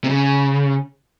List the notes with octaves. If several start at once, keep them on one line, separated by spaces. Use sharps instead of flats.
C3
C#3